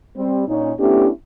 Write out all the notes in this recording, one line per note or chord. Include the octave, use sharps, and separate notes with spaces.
G3 C4
A#2 C#4 D#4
A3 B3 C#4 D4 E4 G4